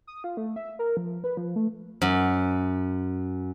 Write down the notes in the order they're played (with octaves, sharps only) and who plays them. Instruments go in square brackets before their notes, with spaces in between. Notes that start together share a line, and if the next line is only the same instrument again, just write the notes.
[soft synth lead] D#6
F4
A3
E5
A#4
F3
B4
F3
A3
[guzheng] F#2